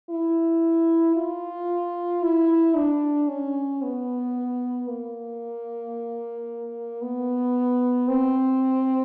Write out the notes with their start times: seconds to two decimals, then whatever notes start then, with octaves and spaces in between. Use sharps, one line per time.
0.10 E4
1.16 F4
2.23 E4
2.76 D4
3.28 C#4
3.82 B3
4.88 A#3
7.02 B3
8.08 C4